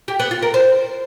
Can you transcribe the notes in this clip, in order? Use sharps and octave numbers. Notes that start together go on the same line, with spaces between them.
G4
B3
F4
A#4
C5